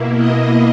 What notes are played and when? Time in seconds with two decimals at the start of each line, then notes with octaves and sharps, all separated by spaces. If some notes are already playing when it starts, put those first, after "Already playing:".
Already playing: B2 A#3 E4
0.16 D#5